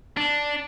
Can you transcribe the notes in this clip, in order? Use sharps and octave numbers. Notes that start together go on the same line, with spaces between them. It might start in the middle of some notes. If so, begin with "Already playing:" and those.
D4